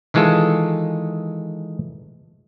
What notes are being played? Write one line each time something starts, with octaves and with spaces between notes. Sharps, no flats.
D#3 E3 G#3 F4 A4